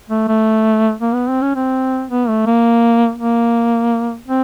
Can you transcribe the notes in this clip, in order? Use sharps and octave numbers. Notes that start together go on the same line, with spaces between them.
A3
A3
A#3
B3
C4
C#4
C4
B3
A3
A#3
A#3
C4